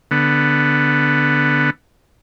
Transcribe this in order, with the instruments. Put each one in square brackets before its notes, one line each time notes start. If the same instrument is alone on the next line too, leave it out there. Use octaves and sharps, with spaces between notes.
[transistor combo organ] D3 B3